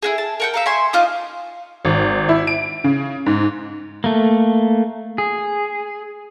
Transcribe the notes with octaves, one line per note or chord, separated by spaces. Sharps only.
E4 F#4 G#4
A5
A#4 F#5 G5
E5 F5 A#5
E5 G#5 C6 C#6
D#4 F4 D6 D#6
G#1
E4
D7
C#3
G#2
A3 A#3
G#4